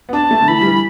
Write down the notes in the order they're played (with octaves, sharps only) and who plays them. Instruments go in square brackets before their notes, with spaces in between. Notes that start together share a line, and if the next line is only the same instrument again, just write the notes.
[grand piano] B3
[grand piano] D4 [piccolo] A5
[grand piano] A3
D3
[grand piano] E3 [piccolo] B5
[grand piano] G3
E3